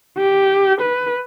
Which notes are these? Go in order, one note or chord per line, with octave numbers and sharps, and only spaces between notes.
G4
B4